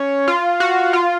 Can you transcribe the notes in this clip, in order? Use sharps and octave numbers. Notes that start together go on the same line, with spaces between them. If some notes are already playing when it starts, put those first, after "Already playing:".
Already playing: C#4
F4
F#4
F4